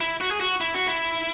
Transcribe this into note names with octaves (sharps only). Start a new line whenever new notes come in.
E4
F#4
G#4
F#4
E4
F#4
E4